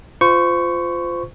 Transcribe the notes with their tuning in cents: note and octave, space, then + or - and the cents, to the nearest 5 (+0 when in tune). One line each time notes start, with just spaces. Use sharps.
F4 +0 C5 -30 C#6 +0